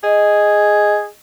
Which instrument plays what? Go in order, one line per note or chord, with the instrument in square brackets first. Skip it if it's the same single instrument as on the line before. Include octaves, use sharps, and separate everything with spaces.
[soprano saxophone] G#4 [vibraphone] D#5